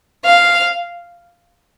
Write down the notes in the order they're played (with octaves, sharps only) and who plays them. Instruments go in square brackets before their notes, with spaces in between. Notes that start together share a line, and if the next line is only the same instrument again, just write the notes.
[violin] F5